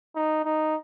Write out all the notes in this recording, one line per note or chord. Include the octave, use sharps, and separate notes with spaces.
D#4
D#4